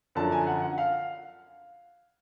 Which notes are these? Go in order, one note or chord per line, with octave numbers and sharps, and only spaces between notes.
F#2 D3 F3 A5
G#5
F#5
F#5
F5